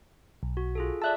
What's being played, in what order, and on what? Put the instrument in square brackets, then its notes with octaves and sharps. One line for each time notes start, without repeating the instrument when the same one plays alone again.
[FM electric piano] B1
[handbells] F#4
F4 G#4 A4
[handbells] D5 E5 E6 [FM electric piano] A5 F#6